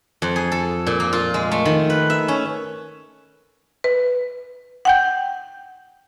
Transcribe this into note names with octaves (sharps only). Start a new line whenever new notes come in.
F2
G#4
A4
A#2
A#3
F4
G#3
A3
D#3
B4
E5
C#4
B4
F#5 G5 G6